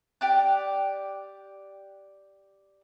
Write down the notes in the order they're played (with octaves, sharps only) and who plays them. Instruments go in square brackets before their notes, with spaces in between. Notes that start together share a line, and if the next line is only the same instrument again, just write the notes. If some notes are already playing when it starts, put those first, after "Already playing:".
[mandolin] G4 D5 F#6